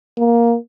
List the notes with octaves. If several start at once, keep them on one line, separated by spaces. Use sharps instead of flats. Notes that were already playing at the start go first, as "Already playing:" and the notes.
A#3